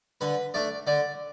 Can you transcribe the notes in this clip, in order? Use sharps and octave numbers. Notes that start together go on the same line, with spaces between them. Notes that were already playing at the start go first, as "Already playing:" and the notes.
D3 B4
A3 D4 D5
D3 D5